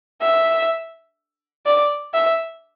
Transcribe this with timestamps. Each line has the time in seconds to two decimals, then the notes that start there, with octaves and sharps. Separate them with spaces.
0.21 E5
1.65 D5
2.14 E5